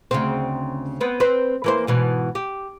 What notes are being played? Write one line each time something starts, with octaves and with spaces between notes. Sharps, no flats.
D2 C#3 C4
B3 C4
C4 B4 C5
E3 A#3 C5
G#2 B2 E3
G4